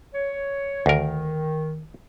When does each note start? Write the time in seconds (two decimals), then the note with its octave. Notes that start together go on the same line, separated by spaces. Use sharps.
0.14 C#5
0.86 D2 D#3 A#4